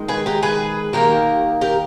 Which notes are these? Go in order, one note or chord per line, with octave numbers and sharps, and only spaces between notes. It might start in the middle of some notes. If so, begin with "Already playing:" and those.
Already playing: D#3 G#3
G#4 B4
G4 A#4
G#4 B4
D#3 G3 A#3 G4 A#4
G4 A#4